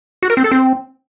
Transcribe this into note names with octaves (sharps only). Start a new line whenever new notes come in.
F#4
A#4
C4
A4
C4